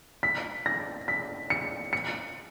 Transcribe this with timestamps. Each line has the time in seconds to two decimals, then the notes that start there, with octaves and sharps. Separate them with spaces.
0.23 B6
0.66 A#6
1.08 B6
1.50 C#7
1.93 C#7